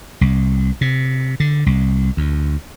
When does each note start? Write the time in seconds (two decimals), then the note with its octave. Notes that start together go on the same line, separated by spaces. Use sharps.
0.21 C2
0.81 C3
1.40 D3
1.66 C2
2.17 D2